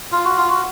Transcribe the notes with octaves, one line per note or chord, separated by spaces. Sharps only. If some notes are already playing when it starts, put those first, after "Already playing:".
F4
F#4
F4
F#4